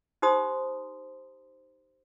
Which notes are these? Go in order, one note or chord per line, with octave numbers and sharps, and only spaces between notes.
D#4 G4 C5 A#5 C6 D#6